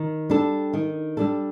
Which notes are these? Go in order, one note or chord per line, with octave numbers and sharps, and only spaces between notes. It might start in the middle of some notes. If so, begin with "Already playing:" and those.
Already playing: D#3
G3 D4 A4
D#3
G3 D4 A4